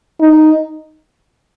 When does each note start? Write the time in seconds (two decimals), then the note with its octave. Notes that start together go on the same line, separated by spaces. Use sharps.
0.20 D#4